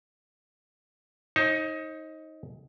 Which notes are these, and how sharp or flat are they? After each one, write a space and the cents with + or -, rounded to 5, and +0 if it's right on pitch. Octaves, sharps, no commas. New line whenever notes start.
D#4 +20 C5 +45